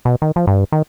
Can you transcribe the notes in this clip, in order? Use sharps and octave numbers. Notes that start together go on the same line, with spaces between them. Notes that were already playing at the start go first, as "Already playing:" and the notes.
B2
D#3
F3
G2
D#3